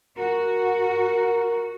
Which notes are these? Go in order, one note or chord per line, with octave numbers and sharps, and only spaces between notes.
F#4 A#4